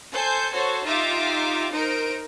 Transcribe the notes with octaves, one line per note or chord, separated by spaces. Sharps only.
A4 C5 G#5 G6
F#4 A4 C5 C#5
D#4 F4 G4 E5 D6
D#4 A#4 C5 D7